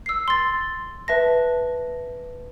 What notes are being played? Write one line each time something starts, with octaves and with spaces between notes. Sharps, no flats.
E6 C7
C6 A6
B4 E5 A5 A#6